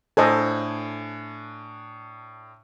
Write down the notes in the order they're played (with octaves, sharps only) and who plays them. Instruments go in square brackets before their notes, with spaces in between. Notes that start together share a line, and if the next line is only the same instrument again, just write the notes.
[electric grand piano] A2 D4 G#5 [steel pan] A4 C5 D#5